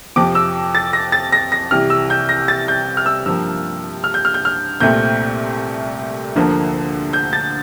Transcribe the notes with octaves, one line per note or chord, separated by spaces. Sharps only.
F2 C3 F3 D6
E6
A6
A#6
A6
A#6
A#6
C2 C3 E3 F6
E6
G6
A#6
A6
G6
F6
E6
G2 F3 A#3 E6
F6
G6
F6
G6
F6
C2 A#2 A3 C4 G6
D2 D3 F3 A#3
G6
A6